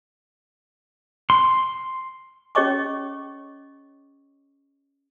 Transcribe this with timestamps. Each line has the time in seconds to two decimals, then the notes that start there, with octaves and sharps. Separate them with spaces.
1.30 C6
2.55 C#4 G#4 C#5 D#5 C#6 D6